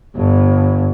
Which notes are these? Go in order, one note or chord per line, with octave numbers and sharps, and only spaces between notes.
G1 G2